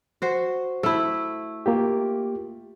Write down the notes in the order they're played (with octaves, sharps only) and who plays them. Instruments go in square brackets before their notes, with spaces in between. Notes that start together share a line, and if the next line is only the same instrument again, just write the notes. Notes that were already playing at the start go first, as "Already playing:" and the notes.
[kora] F#4 C5
A3 E4
[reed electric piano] A#3 F4 G4